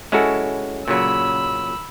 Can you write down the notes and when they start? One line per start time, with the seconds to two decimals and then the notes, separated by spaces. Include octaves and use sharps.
0.12 G#3 C#4 E4 F#4 A4
0.88 A#2 C#3 F#3 B5 E6